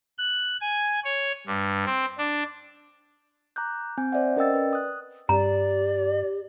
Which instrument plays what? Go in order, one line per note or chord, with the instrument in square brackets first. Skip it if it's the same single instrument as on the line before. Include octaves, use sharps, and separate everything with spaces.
[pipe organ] F#6
G#5
C#5
G2
C4
D4
[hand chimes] A#5 D6 F#6 G6
C4 G#5 G6
C5 D5 E5 F#5
C#4 A#4 D#5 G5 E6 A6
B4 D5
D#6 F#6
[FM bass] G2 [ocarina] G4 [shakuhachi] D5 [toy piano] A#5